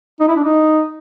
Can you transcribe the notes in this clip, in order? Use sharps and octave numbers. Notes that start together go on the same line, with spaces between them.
D#4
E4
D4
D#4